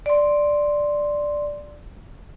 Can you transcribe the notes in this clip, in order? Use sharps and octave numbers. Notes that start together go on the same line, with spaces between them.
D5 C6